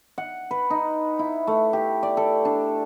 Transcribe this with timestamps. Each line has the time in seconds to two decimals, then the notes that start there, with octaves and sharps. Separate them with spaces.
0.18 F#5
0.51 B4
0.70 D#4
1.19 E4
1.47 A3
1.73 G4
2.03 D5
2.17 A4
2.45 D4